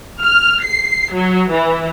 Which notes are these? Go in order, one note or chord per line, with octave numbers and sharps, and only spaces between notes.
F6
C7
F#3
E3